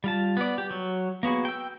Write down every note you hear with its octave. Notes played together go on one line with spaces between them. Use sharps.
G3 F4 A5
B3 D5
G4
F#3
A#3 B3 F#4 G#4
G5 E6